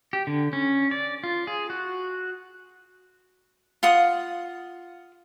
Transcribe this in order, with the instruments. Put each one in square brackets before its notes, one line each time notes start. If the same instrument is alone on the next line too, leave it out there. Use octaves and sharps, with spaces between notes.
[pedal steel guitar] G4
D3
C#4
D5
F4
G#4
F#4
[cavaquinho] F4 F#5 D#6